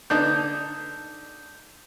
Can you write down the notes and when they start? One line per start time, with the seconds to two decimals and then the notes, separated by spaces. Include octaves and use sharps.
0.10 D3 D4 D#4 G6